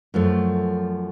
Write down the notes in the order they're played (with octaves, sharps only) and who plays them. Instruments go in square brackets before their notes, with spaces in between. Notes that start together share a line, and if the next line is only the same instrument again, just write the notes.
[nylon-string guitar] F#2 F3 A3